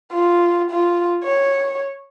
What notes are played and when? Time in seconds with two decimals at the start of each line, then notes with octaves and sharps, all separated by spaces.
0.12 F4
0.71 F4
1.24 C#5